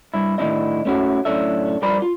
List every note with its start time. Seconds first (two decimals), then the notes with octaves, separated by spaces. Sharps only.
0.14 G2 E4
0.38 A2 D#3 C#4 D4 E4 D#5
0.85 A3 C#4 E4 F#4
1.25 F#2 A2 C#4 D4 A4 E5
1.82 G2 F3 A#4 D5 B5
2.02 F4